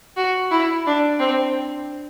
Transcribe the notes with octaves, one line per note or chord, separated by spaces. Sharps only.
F#4
E4
D4
C4